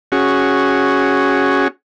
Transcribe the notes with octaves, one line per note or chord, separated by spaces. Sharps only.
C#4 F#4 G#4